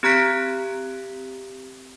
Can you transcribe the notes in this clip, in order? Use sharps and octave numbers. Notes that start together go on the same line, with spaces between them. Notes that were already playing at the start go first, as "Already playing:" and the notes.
C4 G4 A#5 F#6 B6 D7